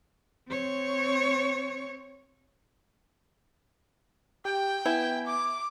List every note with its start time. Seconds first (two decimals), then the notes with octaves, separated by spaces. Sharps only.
0.49 C4 C#5
4.45 G4 G5
4.86 B3 E4 G#5
5.27 D6